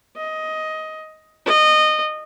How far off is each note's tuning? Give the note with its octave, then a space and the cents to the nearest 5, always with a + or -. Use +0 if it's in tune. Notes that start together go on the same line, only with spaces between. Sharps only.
D#5 +15
D#5 -20